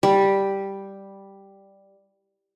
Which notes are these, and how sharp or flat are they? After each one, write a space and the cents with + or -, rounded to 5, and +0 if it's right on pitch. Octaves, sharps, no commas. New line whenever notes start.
G3 +0 G4 +0